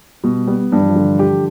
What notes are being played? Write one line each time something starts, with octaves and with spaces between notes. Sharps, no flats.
B2 G3
G3 B3
G2 F3
E3
F3
D3
G4